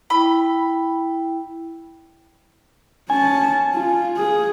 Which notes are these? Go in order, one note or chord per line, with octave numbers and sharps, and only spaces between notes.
E4 G5 B5
C#4 G#5 A5
F4
G#4